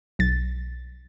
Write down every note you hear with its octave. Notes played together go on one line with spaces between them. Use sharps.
B1 A6